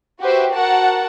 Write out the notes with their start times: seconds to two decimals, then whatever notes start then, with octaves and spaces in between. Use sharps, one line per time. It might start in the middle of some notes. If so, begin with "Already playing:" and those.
0.21 F#4 G4 B4 C5 E5
0.52 F#4 A#4 F#5 A5